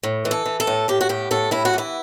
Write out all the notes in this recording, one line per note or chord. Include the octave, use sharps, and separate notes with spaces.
A2
E3
A4
E3
A4
A2
A2 G4
F#4
A2 G4
A2 A4
A2 E4
F#4
E3 E4